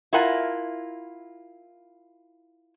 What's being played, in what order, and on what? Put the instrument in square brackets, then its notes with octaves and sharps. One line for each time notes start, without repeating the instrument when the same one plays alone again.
[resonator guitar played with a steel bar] E4 F4 A#4 F#5 G#5